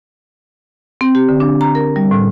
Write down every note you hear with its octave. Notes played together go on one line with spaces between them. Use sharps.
C4
G4
D3
D4
A#5
A#4
G3
A2